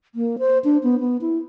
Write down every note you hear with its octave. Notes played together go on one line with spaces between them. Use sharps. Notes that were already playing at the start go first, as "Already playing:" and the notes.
A#3
C5
D4
B3
B3
E4